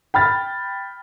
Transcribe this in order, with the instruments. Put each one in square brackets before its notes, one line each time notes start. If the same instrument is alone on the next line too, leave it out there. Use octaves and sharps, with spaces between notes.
[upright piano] G5 B5 F6 A6